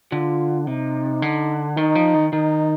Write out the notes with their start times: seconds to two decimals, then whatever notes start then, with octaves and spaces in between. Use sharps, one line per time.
0.12 D3 F4
0.67 C3 D#4
1.22 D3
1.77 D#3 D#4
1.95 F3
2.14 D#3
2.33 D#3 D#4